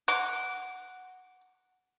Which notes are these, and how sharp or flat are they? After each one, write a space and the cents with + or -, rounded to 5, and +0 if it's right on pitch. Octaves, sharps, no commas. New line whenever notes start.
F#5 +0 D6 -20